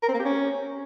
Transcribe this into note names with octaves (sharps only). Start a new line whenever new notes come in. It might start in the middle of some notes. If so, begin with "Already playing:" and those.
A#4
C4
A#3
G4
C#4